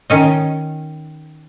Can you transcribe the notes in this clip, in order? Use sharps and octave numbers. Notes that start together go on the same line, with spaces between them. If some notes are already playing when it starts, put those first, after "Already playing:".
D#3 C#4 D#5